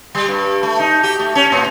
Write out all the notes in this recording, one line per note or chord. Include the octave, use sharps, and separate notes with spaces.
G3
G2
A3
D#4
G4
A3
C#4
A2